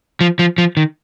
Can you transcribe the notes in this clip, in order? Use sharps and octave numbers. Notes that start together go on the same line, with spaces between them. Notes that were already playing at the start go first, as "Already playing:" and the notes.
F3
F3
F3
D#3